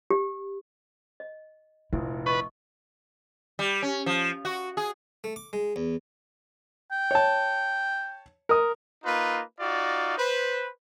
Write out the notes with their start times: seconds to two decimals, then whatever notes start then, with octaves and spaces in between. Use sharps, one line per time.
0.10 G4
1.20 D#5
1.93 F1 A#1 E4
2.26 B4 D#5 C#6
3.59 G3
3.82 C#4
4.06 F3
4.45 F#4
4.77 G#4
5.24 A3
5.36 D6
5.53 G#3
5.76 E2
6.91 G5
7.11 C#5 A5
8.49 A#4 D#6
9.05 A#3 D#4 F4 B4
9.60 D#4 F4 F#4 D5
10.17 B4 C5